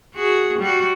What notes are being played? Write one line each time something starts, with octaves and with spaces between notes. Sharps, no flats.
F#4 G#4
G3 F#4